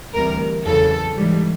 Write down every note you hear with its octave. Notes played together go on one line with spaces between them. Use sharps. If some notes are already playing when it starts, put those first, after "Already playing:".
D2 C3 E3 G3 A#4
E2 C#3 F#3 A4
G#2 E3 G3